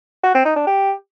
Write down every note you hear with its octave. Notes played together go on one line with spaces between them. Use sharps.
F#4
C4
D#4
D4
G4